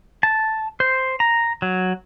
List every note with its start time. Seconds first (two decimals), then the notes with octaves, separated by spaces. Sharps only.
0.23 A5
0.80 C5
1.20 A#5
1.62 F#3